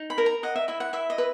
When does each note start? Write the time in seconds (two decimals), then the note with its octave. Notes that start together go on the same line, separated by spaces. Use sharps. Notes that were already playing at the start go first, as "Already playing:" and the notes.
Already playing: D#4
0.10 B5
0.18 A#4
0.26 A#5
0.43 D#5 F#5
0.56 E5
0.68 E4 E5
0.80 F#5
0.93 E4 E5
1.10 D#5
1.18 B4